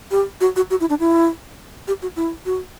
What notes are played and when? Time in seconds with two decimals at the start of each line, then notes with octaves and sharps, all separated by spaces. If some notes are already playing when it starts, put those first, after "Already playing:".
0.11 G4
0.41 F#4
0.56 F#4
0.70 F#4
0.80 E4
0.89 D4
1.00 E4
1.87 G4
2.02 F#4
2.16 E4
2.46 F#4